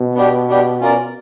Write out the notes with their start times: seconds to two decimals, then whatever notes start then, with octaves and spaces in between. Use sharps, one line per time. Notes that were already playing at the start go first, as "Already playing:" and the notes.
Already playing: B2
0.15 B3 D4 G4
0.48 B3 D4 G4
0.80 C#4 F4 A#4 D5